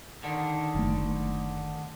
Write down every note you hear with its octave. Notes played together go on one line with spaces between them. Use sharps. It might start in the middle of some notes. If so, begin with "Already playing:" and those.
D3 D#3
F#1 A3